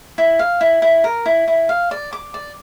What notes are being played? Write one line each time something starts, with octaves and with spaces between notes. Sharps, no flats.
E4
F5
E4
E4
A#4
E4
E4
F5
D5
D6
D5